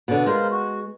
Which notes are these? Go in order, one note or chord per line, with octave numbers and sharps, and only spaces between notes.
B2 D3
G#3 F4 A#4 C5
F#4